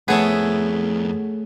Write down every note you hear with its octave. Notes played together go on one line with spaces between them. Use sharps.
F2 A3 B3 E4 G#4 C#5 E5 A5